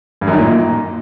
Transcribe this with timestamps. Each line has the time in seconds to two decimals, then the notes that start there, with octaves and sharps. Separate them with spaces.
0.21 G2
0.27 F#2
0.33 D#3
0.39 A#2